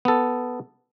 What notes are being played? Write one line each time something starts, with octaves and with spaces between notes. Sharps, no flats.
B3 A4